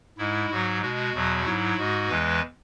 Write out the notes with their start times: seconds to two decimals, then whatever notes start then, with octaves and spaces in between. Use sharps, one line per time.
0.18 G#2 G#3 E4
0.50 G#2 F#3 F#4
0.81 B2 G#3 F#4
1.13 E2 B2 F#3
1.45 G#2 F#3 E4
1.77 G#2 G#3 F#4
2.09 E2 E3 G#3 B4